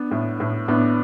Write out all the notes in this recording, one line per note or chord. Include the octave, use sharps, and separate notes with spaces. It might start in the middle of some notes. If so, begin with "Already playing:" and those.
Already playing: B3 D4
A2
A2
A2 B3 D4